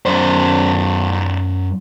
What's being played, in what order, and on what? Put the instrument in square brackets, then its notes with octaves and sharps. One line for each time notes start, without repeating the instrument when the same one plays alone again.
[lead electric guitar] F#2 C5